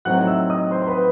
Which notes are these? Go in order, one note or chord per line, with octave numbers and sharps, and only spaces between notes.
A2 F#3 C4 D#4 F#5 F#6
E5 E6
D#5 D#6
C5 C6
C6
B4 B5